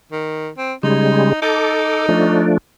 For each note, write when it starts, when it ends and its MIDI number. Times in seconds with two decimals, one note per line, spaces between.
0.12 0.49 51
0.58 0.73 60
0.83 1.33 49
0.83 1.33 55
0.83 1.33 56
0.83 1.39 63
1.42 2.52 63
1.42 2.06 69
1.42 2.06 86
2.09 2.58 53
2.09 2.58 57
2.09 2.58 62